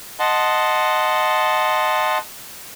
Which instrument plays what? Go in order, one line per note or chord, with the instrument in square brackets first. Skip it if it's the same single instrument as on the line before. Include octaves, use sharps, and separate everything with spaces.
[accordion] D#5 F#5 A5 C6